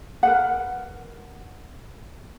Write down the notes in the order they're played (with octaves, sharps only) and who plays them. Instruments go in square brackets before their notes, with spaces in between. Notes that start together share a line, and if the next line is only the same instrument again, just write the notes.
[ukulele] A#4 B4 F#5